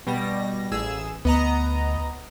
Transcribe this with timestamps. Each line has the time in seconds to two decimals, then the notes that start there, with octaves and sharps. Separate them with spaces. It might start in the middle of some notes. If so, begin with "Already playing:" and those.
0.07 B2 G3 A#6
0.71 A1 G#4 E6
1.25 D2 B3 D#5 A#5